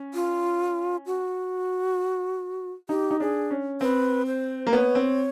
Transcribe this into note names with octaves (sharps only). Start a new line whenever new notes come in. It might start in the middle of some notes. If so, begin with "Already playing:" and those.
Already playing: C#4
F4
F#4
D#4 G4
D#4
D4 G#4
C#4
C4 B4
C5
A#3
B3 C#5
C4